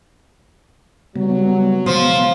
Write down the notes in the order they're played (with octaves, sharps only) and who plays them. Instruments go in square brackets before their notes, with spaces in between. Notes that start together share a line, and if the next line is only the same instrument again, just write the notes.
[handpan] C#3 [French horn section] F#3 [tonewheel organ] G3 B3
[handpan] B2 E3 G#3 [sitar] F3 [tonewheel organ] B3